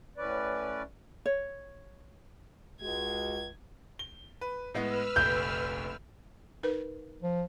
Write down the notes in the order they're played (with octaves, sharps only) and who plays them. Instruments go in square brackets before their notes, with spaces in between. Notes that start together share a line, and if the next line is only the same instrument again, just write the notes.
[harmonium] A2 C#4 B4 D5
[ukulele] C#5
[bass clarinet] C#2 [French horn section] G#3 F#4 [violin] G#6
[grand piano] G7
B4
[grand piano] A2 G#3 B3 [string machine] B4 E6 F6
[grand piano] F1 A#1 [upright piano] G6
[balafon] D#4 A#4 B4
[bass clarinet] F3